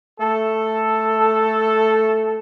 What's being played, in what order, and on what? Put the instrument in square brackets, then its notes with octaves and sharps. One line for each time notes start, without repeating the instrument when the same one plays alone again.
[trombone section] A3 A4